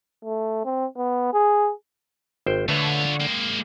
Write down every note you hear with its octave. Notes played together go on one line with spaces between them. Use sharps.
A3
C4
B3
G#4
G#1 C5 G5
D3 A3 F4 B4 C#5 E5
G#3 A#3 G5